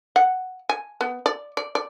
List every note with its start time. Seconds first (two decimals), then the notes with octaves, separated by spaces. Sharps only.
0.16 F#5
0.69 G#5
1.01 B3
1.26 D5
1.57 D5
1.75 D5